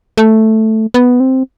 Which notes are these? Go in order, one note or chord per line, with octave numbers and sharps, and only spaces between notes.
A3
B3
C4